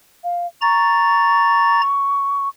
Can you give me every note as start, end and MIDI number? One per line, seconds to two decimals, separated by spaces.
0.24 0.47 77
0.62 1.81 82
0.62 2.49 85
0.62 1.81 93